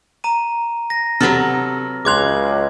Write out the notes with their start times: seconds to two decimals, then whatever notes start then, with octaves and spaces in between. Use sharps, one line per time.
0.24 A#5 D#7
0.90 A#6
1.20 C3 F#3 B3 A4 F6 A#6
2.05 C#2 G#4 C6 D6 F#6 G#6 F7